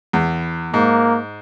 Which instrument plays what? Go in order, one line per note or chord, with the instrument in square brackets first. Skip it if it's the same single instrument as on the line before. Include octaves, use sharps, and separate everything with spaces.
[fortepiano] E2
[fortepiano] G#2 [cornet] A#3